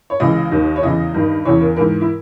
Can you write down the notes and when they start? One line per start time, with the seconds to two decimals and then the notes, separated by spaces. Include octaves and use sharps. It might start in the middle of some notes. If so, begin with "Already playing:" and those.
0.10 C#5
0.20 C#2 C#3 E3 D#5
0.51 D#2 D#3
0.76 C#5
0.82 E2 C#3 E3 D#5
1.14 G2 D#3
1.45 E2 C#3 E3 C#5
1.61 A#4
1.76 G#2 E3 A#4
2.01 E4